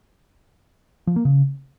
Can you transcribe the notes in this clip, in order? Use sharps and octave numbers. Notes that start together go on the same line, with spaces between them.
F3
A#3
C#3